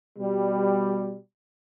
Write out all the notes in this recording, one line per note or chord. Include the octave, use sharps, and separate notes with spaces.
B2 G3